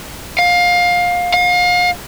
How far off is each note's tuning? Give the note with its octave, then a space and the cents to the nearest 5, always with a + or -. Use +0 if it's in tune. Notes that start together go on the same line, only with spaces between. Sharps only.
F5 +20
F5 +35